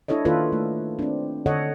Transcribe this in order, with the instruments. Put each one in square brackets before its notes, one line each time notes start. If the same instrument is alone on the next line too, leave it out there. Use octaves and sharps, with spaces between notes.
[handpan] D4 E4 A4 C#5 D#5
D#3 A#3 E4 F4 A4 B4
A3
C4 D4
D3 A4 C#5 D#5 F#5